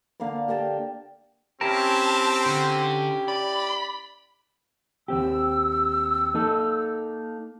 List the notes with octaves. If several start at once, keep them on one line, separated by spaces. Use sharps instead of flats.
D3 A#3 F5 B5
G4 A#4 G5 A5
C4 C#4 E4 G4 A#4 A5
D3
D5 B5
D#2 C4 G4 E6
A#3 D#4 A4